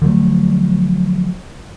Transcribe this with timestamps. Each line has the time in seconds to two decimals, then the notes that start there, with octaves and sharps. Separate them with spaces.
0.02 D3 F3 F#3 A3